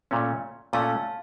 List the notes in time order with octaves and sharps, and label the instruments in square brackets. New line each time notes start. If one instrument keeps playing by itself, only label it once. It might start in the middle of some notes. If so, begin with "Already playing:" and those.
[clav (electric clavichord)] A#2 A3 C#4
[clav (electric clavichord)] A#2 A3 C#4 [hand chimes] F5 A5